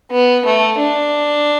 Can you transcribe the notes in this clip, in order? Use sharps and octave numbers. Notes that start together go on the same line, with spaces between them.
B3
A3
D4